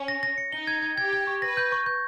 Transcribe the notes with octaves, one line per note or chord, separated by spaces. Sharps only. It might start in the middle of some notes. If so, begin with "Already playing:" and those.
Already playing: C#4
A#6
A#6
C#7
D#4 G7
G#6
G#6
G4 G#6
G#6
C#6
B4 A#6
G6
C#6
G6